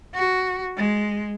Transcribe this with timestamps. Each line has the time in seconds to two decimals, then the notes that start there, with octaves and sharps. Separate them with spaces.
0.14 F#4
0.77 G#3